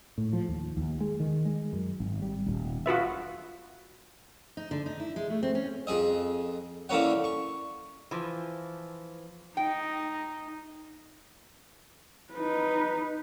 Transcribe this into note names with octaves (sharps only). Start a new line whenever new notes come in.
A2
F3
D#2
D#2
G#3
D#3
G#3
F#2
G#1
G3
D#1
F4 F#4 B4 E5
D#4
D3
D#4
E4
G#3
A3
C4
C#4
F2 G#4 D#5
D3 E3 A#3 C#4 C#5 F#5
C#6
E3 F3
D#4 G5
D#4 B4